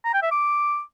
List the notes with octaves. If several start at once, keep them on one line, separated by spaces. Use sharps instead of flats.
A#5
G5
E5
D6